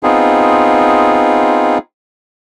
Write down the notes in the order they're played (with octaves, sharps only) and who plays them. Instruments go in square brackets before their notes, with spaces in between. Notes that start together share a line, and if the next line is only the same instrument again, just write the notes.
[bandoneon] B3 C4 D#4 F4 G#4